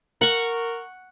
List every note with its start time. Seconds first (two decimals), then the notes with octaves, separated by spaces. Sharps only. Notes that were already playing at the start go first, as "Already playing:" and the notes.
0.21 A#4 F#5 C#6